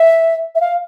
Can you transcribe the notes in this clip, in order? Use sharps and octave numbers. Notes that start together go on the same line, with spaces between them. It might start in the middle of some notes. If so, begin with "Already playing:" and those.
Already playing: E5
E5
F5